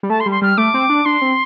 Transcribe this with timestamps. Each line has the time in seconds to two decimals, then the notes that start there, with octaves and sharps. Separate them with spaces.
0.03 G3
0.10 A3 A5
0.20 C6
0.26 G3
0.31 C6
0.42 G3 F6
0.58 A3 D6
0.74 C4
0.90 D4
1.05 D4 C6
1.22 C4